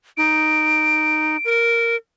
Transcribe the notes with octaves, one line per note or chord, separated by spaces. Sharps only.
D#4 D7
A#4